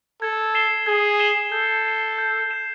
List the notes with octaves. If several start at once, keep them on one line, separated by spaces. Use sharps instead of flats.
A4 G#6
C7 E7 G7
G#4 G#6
C7 E7 G7
A4 G6
C7 E7
G6
C7 E7